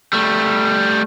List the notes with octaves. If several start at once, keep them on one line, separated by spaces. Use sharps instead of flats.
G3 A3